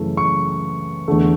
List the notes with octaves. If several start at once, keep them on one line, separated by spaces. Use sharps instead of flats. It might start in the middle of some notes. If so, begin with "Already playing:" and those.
Already playing: F#2 C#3 E3 A3
C#6
E2 D3 A3